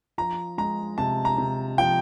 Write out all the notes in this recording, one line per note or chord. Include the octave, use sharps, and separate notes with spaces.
F3 A#5
G#3 A#5
C3 A5
A#5
C3
F3 G5